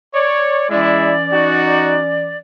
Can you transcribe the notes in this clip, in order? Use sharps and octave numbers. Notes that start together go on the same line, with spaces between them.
C#5 D5
E3 G#3 C#4 E4 D5
D#4 F#4